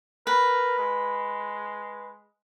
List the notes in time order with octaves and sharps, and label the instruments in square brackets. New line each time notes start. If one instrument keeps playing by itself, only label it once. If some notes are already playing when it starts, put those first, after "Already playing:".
[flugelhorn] A#4 [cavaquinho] B4
[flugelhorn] G#3